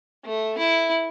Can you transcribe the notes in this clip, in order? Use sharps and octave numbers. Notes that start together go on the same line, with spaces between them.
A3
E4